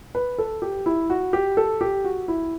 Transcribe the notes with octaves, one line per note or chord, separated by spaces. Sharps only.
B4
A4
G4
E4
F#4
G4
A4
G4
F#4
E4